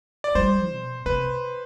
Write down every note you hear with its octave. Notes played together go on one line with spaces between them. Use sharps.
D5
G3 C5
B2
C3 B4